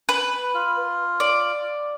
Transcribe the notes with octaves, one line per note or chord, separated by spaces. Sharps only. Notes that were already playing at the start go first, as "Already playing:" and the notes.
B4
F4
D5